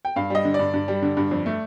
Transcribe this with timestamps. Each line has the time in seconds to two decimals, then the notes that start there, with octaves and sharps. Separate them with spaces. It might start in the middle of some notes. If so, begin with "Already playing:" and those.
0.05 G5
0.16 G2 F5
0.30 G3 D#5
0.45 D3
0.54 G2 D5
0.74 G2
0.88 G3
1.02 D3
1.17 G2
1.31 F2
1.46 A3